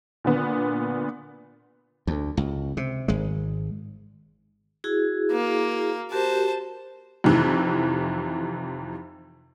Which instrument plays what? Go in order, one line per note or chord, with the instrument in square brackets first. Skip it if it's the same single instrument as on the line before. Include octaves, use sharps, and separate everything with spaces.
[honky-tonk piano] A#2 D3 B3
[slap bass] D2
C#2
C3
G#1 G#3
[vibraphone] E4 F#4 G#4
[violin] A#3
[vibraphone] F#4 G4 A#4 [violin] C5 A5
[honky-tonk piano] F2 C3 D#3 E3